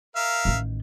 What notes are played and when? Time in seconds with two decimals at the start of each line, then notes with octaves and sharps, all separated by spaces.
0.16 A#4 E5 F5
0.45 A1 D#3